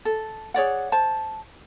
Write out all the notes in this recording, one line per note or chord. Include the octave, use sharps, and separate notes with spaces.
A4
G#4 C#5 D5 F#5
C5 A5